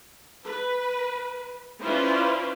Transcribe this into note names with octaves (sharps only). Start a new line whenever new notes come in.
B4
C#4 E4 F4 B4 C5 D5